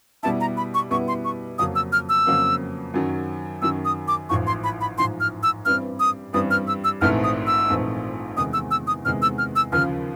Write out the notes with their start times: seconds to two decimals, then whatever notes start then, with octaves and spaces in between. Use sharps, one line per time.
0.23 B2 G3 B3 E4 A5
0.41 A#5
0.57 B5
0.74 C#6
0.91 B2 G3 B3 E4 C#6
1.08 C6
1.25 C#6
1.58 F2 C#3 F#3 A#3 C#4 D#6
1.75 E6
1.92 F6
2.09 E6
2.26 F2 C#3 F#3 A#3 C#4
2.94 F#2 D#3 F#3
3.62 F#2 D#3 F#3 E6
3.85 D#6
4.08 D6
4.29 A1 G#2 F3 C#6
4.47 C6
4.64 B5
4.81 B5
4.98 A1 G#2 F3 C6
5.20 F6
5.43 E6
5.65 G2 E3 G3 C4 F6
6.00 D#6
6.33 G2 E3 G3 C4 D#6
6.51 F6
6.68 E6
6.84 E6
7.01 A#1 G#2 E3 A3 C4 F6
7.24 D#6
7.47 E6
7.68 A#1 G#2 E3 A3 C4
8.37 E2 C3 D#3 G#3 B3 D#6
8.53 E6
8.71 E6
8.87 D#6
9.05 E2 C3 D#3 G#3 B3 F6
9.22 E6
9.38 F6
9.56 E6
9.72 D#2 C#3 F3 F6